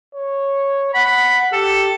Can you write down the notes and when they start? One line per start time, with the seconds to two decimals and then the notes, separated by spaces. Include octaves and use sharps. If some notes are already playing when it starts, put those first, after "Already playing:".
0.15 C#5
0.94 F#5 B5
1.53 G4 A4